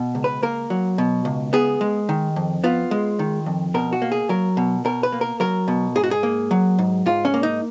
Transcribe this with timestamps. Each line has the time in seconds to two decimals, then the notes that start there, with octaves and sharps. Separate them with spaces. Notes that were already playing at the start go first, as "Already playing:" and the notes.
Already playing: B2
0.15 C#2
0.24 B4
0.43 A#3 A#4
0.70 F#3
0.98 B2
1.25 C#2
1.53 B3 G#4
1.81 G#3
2.09 D#3
2.36 F2
2.64 B3 F4
2.91 G#3
3.19 D#3
3.46 F2
3.74 B2 A#4
3.93 F#4
4.02 A#3
4.12 G#4
4.29 F#3 A#4
4.57 B2
4.85 B2 A#4
5.03 B4
5.12 A#3
5.21 A#4
5.40 F#3 A#4
5.68 B2
5.95 G#2 G#4
6.04 F#4
6.11 G#4
6.23 A#3
6.51 F#3
6.79 G#2
7.06 G#2 F4
7.25 C#4
7.34 A#3
7.43 D#4